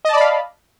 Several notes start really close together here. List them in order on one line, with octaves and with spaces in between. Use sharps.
D#5 A5 D5 B5 F5